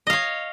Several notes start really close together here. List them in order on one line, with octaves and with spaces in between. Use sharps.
D#5 F5 C#5